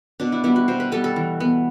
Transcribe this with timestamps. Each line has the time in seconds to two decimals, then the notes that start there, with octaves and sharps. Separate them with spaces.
0.20 B2 D4
0.32 E4
0.44 G3 B3 E4
0.56 F#4
0.68 B2 C5
0.80 B4
0.92 G3 B3 A4
1.04 A4
1.16 E3
1.40 B3